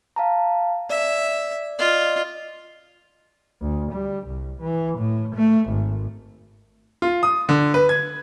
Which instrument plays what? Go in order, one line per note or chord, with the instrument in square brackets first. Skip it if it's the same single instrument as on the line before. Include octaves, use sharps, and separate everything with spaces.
[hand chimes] F5 A5 A#5
[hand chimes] D5 [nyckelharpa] E5
[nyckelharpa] F4 [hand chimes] D5 D#5
[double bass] D2
G3
C2
E3
A2
A3
G#1
[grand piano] F4
D#6
D3
B4
G#6